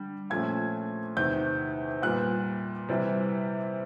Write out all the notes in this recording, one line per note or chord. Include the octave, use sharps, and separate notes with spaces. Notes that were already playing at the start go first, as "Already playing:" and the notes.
Already playing: D3 G3
A#2 F3 A3 C#4 G#6
E2 C3 D#3 G6
A#2 G3 B3 F#6
C3 E3 G3